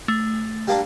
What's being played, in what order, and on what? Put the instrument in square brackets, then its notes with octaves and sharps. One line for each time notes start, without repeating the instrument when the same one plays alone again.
[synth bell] A3
[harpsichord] G3 A#3 D4